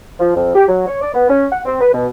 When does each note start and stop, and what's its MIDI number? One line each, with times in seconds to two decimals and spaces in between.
0.20 0.34 53
0.35 0.51 41
0.55 0.65 67
0.68 0.87 54
0.87 0.97 73
1.02 1.10 74
1.14 1.26 59
1.29 1.46 61
1.52 1.61 78
1.65 1.78 60
1.81 1.93 71
1.93 2.07 47